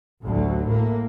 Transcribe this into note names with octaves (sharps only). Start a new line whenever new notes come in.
A1 D2 F#3
A2 A#3